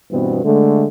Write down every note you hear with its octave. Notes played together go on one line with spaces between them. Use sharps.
G2 B2 E3 B3 C4
D3 G#3 A3